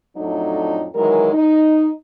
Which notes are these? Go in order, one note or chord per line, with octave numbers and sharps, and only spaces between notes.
F2 A2 F#3 A3 D4 D#4
D#3 E3 F#3 G#3 A#4
D#4